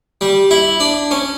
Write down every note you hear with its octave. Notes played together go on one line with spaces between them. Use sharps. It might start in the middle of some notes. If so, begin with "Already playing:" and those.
G3
E4
D4
C#4